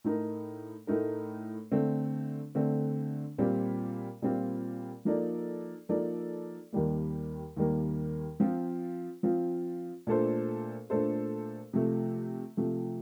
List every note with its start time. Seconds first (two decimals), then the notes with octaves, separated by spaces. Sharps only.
0.04 A2 A3 D#4 A#4
0.87 A2 A3 D#4 A#4
1.72 D3 A3 C4
2.55 D3 A3 C4
3.38 A#2 G3 C4 F4
4.22 A#2 G3 C4 F4
5.05 F3 A#3 D#4 A4 D5
5.89 F3 A#3 D#4 A4 D5
6.72 D#2 D#3 G3 A#3
7.56 D#2 D#3 G3 A#3
8.40 F3 C4 F4
9.23 F3 C4 F4
10.07 A#2 A3 D4 A4 C5
10.90 A#2 A3 D4 A4 C5
11.73 C3 F3 A3
12.57 C3 F3 A3